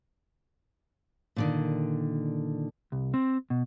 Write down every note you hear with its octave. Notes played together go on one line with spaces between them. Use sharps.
A#2 D3 D#3
C2
C4
B2